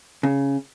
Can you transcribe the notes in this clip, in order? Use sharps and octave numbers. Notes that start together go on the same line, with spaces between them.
C#3